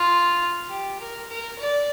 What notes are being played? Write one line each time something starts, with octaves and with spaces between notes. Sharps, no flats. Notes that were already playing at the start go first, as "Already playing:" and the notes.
Already playing: F4
G4
A#4
A#4
D5